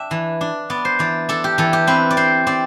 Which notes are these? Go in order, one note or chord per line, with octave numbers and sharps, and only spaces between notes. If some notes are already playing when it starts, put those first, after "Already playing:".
Already playing: D4 E5 G5
E3
D4
B3 D5
C5
E3 D5
D4 A4
G4
E3 A4
G4
C4 B4
D5
C4 C5
C4 D5